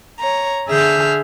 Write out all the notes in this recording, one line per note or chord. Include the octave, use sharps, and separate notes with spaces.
C#5 A#5
D3 G#4 E5 F6 G6